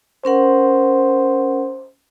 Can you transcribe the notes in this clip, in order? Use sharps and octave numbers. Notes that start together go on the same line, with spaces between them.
C#4 A#4 C5 F#5